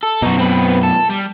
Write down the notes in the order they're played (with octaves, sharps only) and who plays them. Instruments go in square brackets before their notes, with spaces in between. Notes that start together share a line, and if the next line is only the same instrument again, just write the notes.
[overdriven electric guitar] A4
[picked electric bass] F#2 B2 [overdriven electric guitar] D#4 F#4
[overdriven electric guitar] C4 B4
A4
G3